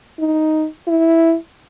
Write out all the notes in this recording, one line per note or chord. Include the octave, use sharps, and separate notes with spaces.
D#4
E4